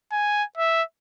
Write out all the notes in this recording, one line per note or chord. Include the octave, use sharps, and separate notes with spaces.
G#5
E5